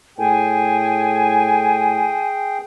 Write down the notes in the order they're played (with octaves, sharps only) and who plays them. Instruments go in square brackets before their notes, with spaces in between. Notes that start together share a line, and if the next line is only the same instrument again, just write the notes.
[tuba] A2 [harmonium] G#4 G5 [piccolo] G#5